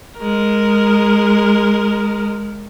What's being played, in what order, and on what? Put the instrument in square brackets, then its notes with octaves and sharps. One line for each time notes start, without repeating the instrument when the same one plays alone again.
[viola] G#3 A#4